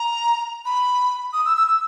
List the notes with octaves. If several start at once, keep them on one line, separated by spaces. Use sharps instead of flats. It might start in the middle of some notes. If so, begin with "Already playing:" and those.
Already playing: A#5
B5
D#6
E6
E6
E6